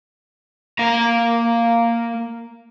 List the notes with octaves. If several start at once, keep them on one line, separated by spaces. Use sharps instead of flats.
A#3 A#5